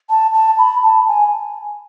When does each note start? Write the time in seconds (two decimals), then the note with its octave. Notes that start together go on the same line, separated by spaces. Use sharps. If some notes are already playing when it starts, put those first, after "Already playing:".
0.10 A5
0.34 A5
0.59 B5
0.83 A5
1.08 G#5